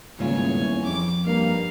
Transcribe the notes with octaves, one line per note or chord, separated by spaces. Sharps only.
D#1 E2 G#2 C#3 F4 C#5 G#5
F2 D6
G2 A#3 D#4 F5